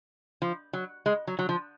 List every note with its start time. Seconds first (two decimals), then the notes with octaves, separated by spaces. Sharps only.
0.42 F3
0.73 F#3
1.06 G#3
1.27 F#3
1.39 F#3
1.49 F3